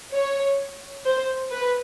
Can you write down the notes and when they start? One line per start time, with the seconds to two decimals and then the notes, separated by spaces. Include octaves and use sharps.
0.14 C#5
1.06 C5
1.51 B4